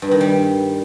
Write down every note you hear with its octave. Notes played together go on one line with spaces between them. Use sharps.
G2
D#3
G3